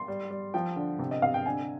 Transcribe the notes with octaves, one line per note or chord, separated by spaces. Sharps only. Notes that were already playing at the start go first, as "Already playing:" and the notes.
Already playing: C6
G3
G3
F3 G5
D3
C3
D#5
C3 F5
G5
D3 G#5